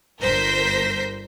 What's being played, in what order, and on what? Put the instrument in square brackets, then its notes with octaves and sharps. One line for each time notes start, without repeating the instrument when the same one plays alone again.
[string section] G1 A#4 C5 G6 A#6 B6